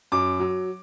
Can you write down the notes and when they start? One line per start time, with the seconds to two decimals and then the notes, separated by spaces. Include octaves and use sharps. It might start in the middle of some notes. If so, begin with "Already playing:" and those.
0.12 F#2 D6
0.40 F#3